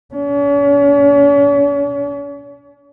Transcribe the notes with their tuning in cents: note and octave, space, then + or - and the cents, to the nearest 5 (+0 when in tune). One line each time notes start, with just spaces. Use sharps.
C#4 +45